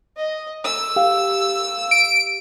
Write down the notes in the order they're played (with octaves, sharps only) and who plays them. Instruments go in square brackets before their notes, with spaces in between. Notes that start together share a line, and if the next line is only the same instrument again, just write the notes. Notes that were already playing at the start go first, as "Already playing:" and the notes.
[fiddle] D#5
E6
[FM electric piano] G4 F5
[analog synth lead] D7